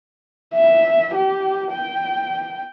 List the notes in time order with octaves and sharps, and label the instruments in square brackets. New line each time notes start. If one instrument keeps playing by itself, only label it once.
[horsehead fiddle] E5
G4
G5